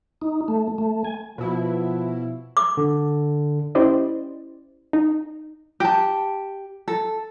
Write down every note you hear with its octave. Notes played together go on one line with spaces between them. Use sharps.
D#4
A3
A3
G#5
B2 F3 E4
D6
D3
C#4 E4 G4 C5 D5 D#5
D#4
G4 A5
A4